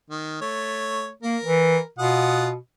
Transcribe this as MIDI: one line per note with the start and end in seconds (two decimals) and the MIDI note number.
0.10 0.41 51
0.41 1.11 57
0.41 1.11 73
1.23 1.37 58
1.23 1.87 70
1.44 1.77 52
1.99 2.55 47
1.99 2.49 65
1.99 2.49 78
1.99 2.49 87